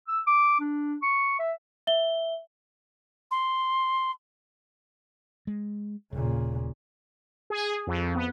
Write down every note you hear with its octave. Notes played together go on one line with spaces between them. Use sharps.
E6
D6
D4
C#6
E5
E5 G7
C6
G#3
D#1 A#2 C#3
G#4
F2
B3